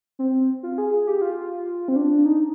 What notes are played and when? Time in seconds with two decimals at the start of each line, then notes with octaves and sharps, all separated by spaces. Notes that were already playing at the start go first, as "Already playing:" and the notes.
0.19 C4
0.63 F4
0.78 G#4
1.07 G4
1.22 F4
1.88 C4
1.96 D4
2.25 D#4